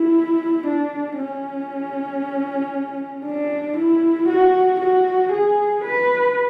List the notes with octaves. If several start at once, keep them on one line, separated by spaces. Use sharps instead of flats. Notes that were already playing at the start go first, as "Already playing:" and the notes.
Already playing: E4
D4
C#4
D4
E4
F#4
F#4
G#4
B4